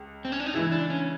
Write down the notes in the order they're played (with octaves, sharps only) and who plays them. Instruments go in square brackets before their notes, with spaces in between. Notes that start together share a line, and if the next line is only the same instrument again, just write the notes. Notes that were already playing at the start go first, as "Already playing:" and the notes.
Already playing: [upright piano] C#2
[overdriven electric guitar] C4
C#4
D4
D#4
[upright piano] C#3 E3 G#3 [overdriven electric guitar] E4
[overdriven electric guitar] D4
C#4